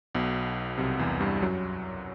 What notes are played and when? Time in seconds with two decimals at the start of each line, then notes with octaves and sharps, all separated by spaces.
0.15 B1 B2
0.78 C2 C3
0.99 E2 E3
1.20 G2 G3
1.41 F#2 F#3